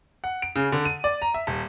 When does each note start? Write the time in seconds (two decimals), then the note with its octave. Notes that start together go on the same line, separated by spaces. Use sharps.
0.24 F#5
0.42 D7
0.56 C#3
0.72 D3
0.85 D#7
1.04 D5
1.22 A#5
1.34 E5
1.47 D#1